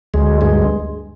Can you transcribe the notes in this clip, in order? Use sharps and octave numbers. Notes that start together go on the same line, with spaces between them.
D2 G#3
G2 G#3